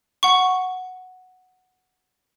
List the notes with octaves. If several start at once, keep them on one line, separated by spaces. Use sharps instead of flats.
F#5 C#6